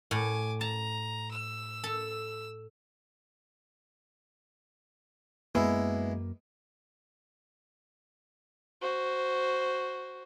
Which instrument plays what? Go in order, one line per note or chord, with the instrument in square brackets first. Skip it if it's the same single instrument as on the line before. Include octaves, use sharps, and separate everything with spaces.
[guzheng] A2 [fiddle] G#5 D6
[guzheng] A5 [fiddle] A#5
[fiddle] E6
[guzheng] A4
[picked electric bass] F#2 A#3 [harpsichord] G#3 B3 E4
[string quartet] F#4 C5